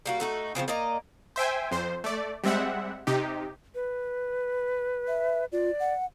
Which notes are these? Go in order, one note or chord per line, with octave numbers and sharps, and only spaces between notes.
G3 A#3 F#4
A3 D#4 F#4
C#3 F3 A3 C4
A#3 D5 D#5 A#5
C5 E5 G5 G#5
F2 C5
A3 D5
G3 G#3 C4 E5 F#5
C3 D#4 G4
B4
E5
F4 D5
F#5